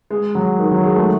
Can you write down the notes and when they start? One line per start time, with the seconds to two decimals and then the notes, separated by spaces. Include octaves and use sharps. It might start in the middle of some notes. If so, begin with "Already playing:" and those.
0.11 G#3
0.35 F#3
0.59 D#3
0.71 F#3
0.83 G#3
0.96 A3